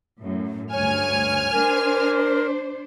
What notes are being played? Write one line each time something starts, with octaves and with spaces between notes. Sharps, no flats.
F#2 A2
D2 G2 C#5 G#5 F6
D4 A#4 C5